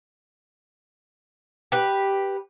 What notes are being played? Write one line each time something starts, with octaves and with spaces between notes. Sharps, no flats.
G4 B4